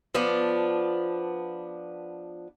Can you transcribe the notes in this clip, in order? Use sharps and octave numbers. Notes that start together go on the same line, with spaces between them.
F3 B3 D4